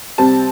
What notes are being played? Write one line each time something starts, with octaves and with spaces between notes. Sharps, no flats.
C3 G3 C4 A5